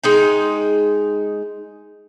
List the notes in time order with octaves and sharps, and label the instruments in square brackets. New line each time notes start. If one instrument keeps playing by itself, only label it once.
[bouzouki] G#3 D#4 G5